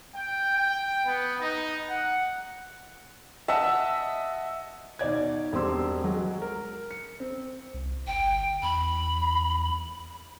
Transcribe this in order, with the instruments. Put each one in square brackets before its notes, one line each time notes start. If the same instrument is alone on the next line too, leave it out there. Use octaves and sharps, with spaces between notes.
[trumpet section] G5
G5
B3
D#4
F#5
[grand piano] D#5 F#5 A5 [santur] E5
[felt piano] B2 D#4 D5 G#6
E1 G2 C4 G4 C6 E6
F#3 G#3
A#4
C#7
C4
[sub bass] C2
[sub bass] G1 [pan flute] G5
[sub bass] E2 [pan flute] B5